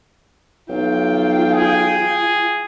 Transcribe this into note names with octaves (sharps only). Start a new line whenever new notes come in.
B1 F4 G5
G#4